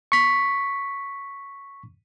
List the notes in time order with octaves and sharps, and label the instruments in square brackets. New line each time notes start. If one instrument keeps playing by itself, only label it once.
[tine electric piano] C#6 B6